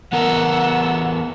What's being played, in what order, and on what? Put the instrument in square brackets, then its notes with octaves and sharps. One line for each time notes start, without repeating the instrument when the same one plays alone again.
[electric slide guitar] E3 B3 A#4 [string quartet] F#5 E6